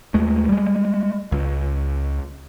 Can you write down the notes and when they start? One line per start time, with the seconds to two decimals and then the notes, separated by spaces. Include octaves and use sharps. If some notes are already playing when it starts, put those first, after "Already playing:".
0.14 D#2 G#3 A3
0.49 G3 G#3
1.32 C#2